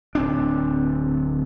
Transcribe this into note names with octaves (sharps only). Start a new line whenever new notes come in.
D1 C4 D4